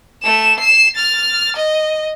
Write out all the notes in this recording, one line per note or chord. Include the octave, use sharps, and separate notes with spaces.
A3 E7
C7 E7
F6 A6
D#5